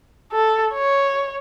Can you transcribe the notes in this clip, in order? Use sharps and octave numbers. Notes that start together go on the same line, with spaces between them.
A4
C#5